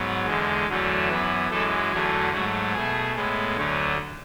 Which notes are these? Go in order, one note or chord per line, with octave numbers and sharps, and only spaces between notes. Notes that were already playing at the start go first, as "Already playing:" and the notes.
Already playing: G#2 F#3 B3
E2 D3 G#3
E2 D3 F#3 A3
F#2 E3 B3 B4
F#2 E3 G#3 A3 A4
E2 D3 F#3 A3 G#4
G#2 F#3 A3 F#4
B2 A3 G#4
A2 G#3 B3
D2 D3 F#3 A3